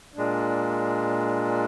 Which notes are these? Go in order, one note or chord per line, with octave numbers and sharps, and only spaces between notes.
A#2 G#3 D4